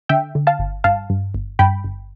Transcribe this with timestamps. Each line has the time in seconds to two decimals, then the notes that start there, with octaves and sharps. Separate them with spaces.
0.09 D3 E5 G5
0.35 D3
0.47 F5 A5
0.59 G1
0.84 G2 F5 A5
1.10 G2
1.35 G1
1.59 G2 G5 B5
1.84 G1